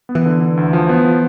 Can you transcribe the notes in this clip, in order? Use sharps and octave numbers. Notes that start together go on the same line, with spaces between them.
B3
E3
D3
D3
D2
F3
B3
F3